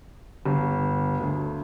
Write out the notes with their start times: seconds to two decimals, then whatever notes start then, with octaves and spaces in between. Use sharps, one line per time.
0.46 G1
1.20 D2